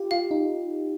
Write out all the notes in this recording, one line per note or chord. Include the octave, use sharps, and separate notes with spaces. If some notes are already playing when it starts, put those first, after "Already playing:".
Already playing: F4 G4
F4 F5
D#4